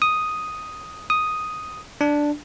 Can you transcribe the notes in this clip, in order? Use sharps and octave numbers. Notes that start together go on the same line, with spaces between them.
D#6
D#6
D4